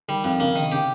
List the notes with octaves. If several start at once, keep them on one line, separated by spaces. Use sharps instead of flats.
D#3 G3
F2
C#3 A#3
D#3
C3
C#3 G4